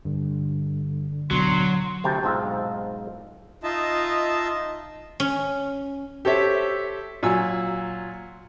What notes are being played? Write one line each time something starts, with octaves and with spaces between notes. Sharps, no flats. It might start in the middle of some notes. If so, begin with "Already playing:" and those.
G2 D3
D1 B2 F#3 D4 C6
D2 C3 G5 A5
B1 G#2 C4 F4 E5 A#5
D#4 F4 D#5 E5 A5
C#4
G4 A4 C5 C#5 E5
A#2 F#3 G#5 E6